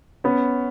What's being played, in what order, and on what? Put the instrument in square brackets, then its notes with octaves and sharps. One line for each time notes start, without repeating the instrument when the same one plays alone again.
[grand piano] B3 C#4